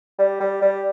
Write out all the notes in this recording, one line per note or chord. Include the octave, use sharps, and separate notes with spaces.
G3
G3
G3